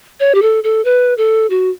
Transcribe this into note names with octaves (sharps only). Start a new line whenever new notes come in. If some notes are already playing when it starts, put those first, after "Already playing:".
C#5
G4
A4
A4
B4
A4
F#4